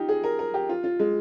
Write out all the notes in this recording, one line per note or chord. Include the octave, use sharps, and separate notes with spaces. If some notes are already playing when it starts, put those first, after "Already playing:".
Already playing: D#4 F4 G4
G#4
A#4
A#4
G4
F4
F4
G#3